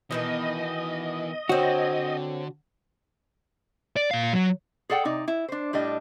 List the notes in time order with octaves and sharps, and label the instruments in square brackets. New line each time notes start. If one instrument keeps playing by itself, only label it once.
[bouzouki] B2 D#3 B3 [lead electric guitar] E3 [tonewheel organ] D#5
[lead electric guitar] D3 [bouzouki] C4 C#5 [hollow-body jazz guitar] F#4
[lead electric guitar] D5
A#2 F5
F#3
[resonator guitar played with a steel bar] G#4 A4 D5 F#5 G5
C3 D#4 D5
E4
D4 C5
A2 G3 D4 D#5